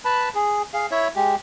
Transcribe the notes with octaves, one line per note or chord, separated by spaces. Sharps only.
B4 A5 B5
G#4
G#4 F5
E4 C#5 E5
G#3 G4